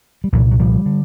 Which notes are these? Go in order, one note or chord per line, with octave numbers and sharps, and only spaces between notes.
G3
C2 A#2 E3 F#3
F#3
F3 G3
D3